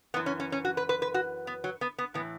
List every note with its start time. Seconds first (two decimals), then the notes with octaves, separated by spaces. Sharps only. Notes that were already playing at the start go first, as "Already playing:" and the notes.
0.14 F#2 E3 B3
0.26 C#4
0.40 C#4
0.52 C#4
0.65 F#4
0.77 B4
0.89 B4
1.02 B4
1.14 F#4
1.47 B3
1.64 F#3
1.81 B3
1.98 B3
2.14 A2 E3 B3